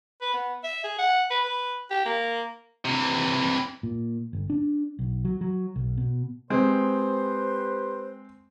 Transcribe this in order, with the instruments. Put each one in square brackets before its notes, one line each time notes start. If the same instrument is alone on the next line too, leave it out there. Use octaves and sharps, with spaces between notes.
[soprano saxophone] B4
B3
E5
G#4
F#5
B4
B4
G4
A#3
[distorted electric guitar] C3 E3
[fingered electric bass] A#2
G1
D4
B1
F#3
F#3
B1
B2
[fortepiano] G#3 C4 [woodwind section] G4 B4 C5